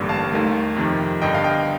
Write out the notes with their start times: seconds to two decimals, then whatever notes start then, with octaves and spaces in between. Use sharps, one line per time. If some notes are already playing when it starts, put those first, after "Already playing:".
Already playing: A1 G2 D3 G3 A#3
0.09 F5 A5
0.32 D#2 D#3 A3
0.76 F2 C3 D#3
1.21 G1 G2 D3 D#5 G5
1.34 F5
1.44 D#5 G5